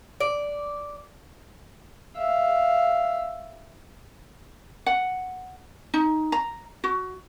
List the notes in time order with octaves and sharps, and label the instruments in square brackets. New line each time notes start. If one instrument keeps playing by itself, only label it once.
[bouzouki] D5
[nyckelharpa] E5 F5
[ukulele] F#5
D#4
A#5
F#4